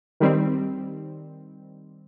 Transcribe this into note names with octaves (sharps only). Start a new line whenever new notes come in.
D#3 G3 C4